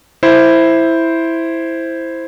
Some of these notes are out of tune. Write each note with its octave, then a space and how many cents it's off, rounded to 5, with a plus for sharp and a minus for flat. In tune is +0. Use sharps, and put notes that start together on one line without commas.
E4 +0 C5 +0